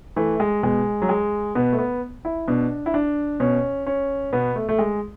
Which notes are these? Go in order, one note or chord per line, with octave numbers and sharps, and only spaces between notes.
E3 A3
G#3
B2 G#3
F#3
G#3
B2 B3
A3
B3
E4
B2 D4
E4
D4
B2 C#4
C#4
B2 B3
A3
A3
G#3